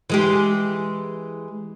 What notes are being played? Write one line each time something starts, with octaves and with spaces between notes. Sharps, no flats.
E3 G#3 G4